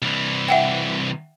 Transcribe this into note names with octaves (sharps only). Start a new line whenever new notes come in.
C2 E3
E5 F#5 G5